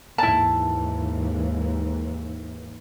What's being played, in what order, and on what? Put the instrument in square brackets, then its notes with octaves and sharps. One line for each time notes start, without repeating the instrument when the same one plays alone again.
[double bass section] D#2 G#2 E3 [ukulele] E4 A5